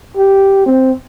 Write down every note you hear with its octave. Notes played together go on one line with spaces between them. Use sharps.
G4
C4